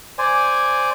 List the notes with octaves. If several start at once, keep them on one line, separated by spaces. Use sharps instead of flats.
C5 D5 G#5